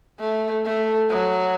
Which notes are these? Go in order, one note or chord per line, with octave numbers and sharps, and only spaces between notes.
A3
A3
F#3